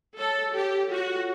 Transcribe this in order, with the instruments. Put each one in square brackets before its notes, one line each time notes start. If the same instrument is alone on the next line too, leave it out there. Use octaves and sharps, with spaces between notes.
[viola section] A4 [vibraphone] C#5
[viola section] G4 [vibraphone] A4
[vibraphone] F4 [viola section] F#4